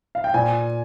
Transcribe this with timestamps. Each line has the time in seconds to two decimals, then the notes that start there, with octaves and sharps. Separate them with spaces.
0.15 F5
0.24 G5
0.34 A#2 G#5